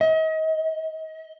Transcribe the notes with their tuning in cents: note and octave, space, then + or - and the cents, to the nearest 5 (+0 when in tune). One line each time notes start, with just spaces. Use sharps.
D#5 +35